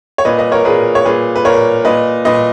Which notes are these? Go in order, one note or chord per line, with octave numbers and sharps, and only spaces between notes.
C#5
A#2 B4 D#5
B4 D#5
A#4 C#5
A#2 G#4 B4
C#5
A#2 G#4 B4
B4
A#2 A#4 C#5
A#2 B4 D#5
A#2 B4 D#5